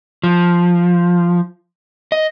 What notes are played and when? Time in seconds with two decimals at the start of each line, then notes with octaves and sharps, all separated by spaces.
0.23 F3
2.12 D#5